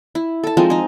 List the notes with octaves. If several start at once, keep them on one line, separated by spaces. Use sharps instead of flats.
E4
A4 A5
F3 G#3 C4 D#4
D#4 G#4